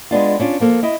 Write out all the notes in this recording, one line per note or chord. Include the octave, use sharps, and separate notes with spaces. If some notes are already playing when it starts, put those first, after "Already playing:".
G#3 B3 D4 F4
C#4 D4 F4
F3 A#3 A4
E4 D#5